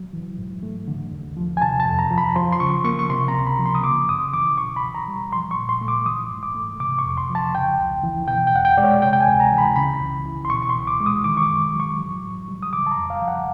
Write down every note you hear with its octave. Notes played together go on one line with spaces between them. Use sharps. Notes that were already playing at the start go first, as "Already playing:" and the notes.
Already playing: F#3
E3
G#2
A3
D3
D#2
F3
G#5
C3 A5
A5
F2
A#5
F3
B5
F3 C6
C6
C#3 C#6
A#3 C#6
C#6
C3 C6
A#5
C#2
B5
F3
C6
D#6
C#3 D6
F#2 D#6
E3 D6
B2 C#6
B5
C2
A#5
G3
F3 C6
C#6
A#2
C6
A3
D6
E3 D#6
G#2
D6
A3
C3 D6
C#6
F2
C6
F3
A5
C#3 G5
C#2
E3
B2 G5
G5
E2 F#5
G5
G#3 D5
C#5
C3 G5
G5
G#5
D2
A#5
E3
B5
C#3 B5
C#2
E3
C6
B2 C#6
C#6
C6
C#2
D6
G#3
D#6
D#3 D6
C#6
D6
F#2
F#3
C#6
E3
A2
G3
D#6
C#3 D6
A5
A#5
F2
F5
F3
F#5